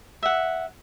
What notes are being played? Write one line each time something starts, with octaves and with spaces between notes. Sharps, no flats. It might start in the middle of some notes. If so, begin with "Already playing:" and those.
E5 F#5